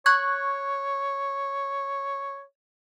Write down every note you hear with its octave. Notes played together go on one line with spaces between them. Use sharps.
C#5 C#6 F#6 G#6